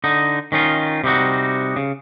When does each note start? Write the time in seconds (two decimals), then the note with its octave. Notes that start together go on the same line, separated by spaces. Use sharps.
0.04 D3 D#4
0.52 D#3 C#4 D#4 F4
1.04 C3 G3 D#4 F#4
1.76 C#3